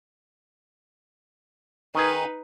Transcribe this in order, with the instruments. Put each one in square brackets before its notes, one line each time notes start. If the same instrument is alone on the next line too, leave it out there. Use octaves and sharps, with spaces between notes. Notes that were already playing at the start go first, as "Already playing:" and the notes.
[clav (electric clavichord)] D#3 G#4 [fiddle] D#4 B4